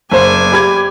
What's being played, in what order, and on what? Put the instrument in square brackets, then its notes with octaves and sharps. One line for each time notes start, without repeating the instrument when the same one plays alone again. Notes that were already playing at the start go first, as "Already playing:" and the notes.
[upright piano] F#1 C5 [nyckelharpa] D5 G#5
[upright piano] G4 B5 G#6